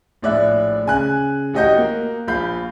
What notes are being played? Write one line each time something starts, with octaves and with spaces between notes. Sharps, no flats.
A#1 A2 D5 E5 F#6
C#3 G#5 F#6
A1 F#4 G4 D#5 F#5 G6
A#3
A#1 F4 F5 B5 G6